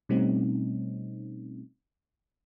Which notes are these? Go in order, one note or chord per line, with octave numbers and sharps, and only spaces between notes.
B2 G3 A3 C4 C#4 D#4